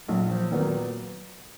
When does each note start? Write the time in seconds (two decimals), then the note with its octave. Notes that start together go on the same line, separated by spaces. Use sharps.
0.09 A#1 F#3
0.30 F3
0.51 A#2 D#3 F#3 B3